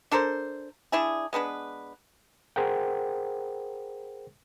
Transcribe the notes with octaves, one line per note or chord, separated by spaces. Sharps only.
D4 A4 A#4 C5
D4 E4 G#4
G#3 B3 D4 B4
G#4 A#4 C5 F#5 G5